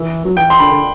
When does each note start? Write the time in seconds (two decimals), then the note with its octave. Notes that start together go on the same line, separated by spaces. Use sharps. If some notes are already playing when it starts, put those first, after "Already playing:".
Already playing: E3
0.25 F#3
0.37 E3 G5
0.50 C6
0.59 D3 B5
0.71 D3